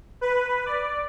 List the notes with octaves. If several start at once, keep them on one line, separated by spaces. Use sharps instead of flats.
B4
D5